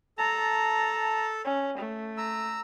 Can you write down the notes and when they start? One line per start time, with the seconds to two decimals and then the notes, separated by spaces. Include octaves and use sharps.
0.18 A4 A5 A#5
1.45 C#4
1.78 A3
2.18 A#5 E6